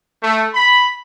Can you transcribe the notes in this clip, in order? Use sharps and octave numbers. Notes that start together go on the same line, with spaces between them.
A3
B5